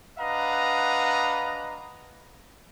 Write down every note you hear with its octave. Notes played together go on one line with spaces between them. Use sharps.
D4 B4 D#5 F5 F#5 A#5